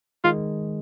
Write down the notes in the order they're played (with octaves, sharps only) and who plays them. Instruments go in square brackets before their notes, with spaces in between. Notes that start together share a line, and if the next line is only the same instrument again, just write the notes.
[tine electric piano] D#3 G#3 [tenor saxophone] F4